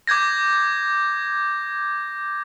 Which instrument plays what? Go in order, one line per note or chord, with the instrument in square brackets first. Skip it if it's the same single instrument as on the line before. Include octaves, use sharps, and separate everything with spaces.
[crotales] D6 G6 G#6 A#6